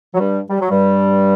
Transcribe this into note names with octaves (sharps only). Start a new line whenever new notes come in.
F#3
G2 G3
G3
F#3
G2 G3